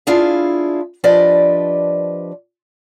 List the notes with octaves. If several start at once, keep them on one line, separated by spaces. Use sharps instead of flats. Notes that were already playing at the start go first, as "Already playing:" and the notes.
D4 E4 F4 G#4 F5
F3 D4 G4 B4 D5 D#5